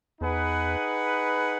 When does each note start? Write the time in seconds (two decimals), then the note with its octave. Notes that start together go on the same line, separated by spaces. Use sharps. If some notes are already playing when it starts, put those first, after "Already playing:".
0.21 E2 D#4 G#4 B4 F#5